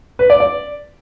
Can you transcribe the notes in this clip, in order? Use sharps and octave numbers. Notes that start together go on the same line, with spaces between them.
B4
D5
D5